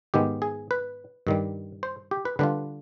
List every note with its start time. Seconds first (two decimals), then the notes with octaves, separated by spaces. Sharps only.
0.14 G#2 D#3 G#3 B3 G4
0.42 G#4
0.71 B4
1.27 G2 D#3 G3
1.83 C5
2.11 G4
2.25 B4
2.39 D3 G3 D4 F4 B4